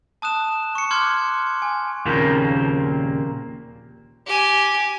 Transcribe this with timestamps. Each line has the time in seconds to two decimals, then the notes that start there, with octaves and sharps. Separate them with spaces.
0.22 A5 D#6 F#6 E7
0.75 C#6 C#7
0.91 C6 D6 F6 F#6 G#6
1.62 G#5
2.06 D#2 A#2 C#3 F3 A#3 C4
4.26 G4 G#5